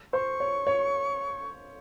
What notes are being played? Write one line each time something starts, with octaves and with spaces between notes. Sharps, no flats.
C5 C#6
C#5
C#5